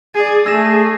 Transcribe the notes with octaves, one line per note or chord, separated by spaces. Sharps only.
G#4 D5
A3 G#4 E6 A#6 E7